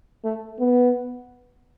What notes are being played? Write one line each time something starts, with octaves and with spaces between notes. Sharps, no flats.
A3
B3